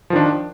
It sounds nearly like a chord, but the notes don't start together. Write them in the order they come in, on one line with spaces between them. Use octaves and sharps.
F3 D#3 D4